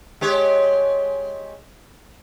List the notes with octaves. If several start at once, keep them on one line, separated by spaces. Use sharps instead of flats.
G#3 G4 C#5